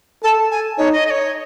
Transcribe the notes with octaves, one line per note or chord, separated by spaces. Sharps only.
A4 A5
G#5
D#4 C#5
D#5
D#5
C#5